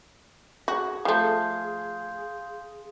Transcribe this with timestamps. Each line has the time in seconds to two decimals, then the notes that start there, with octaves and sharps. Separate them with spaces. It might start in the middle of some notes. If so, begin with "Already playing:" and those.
0.68 F#4 G#4
1.05 F3 A3 F5 C6 G6